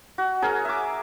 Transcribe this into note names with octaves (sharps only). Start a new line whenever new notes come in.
F#4
C#4 G#4 A#4 A#5
E5 D6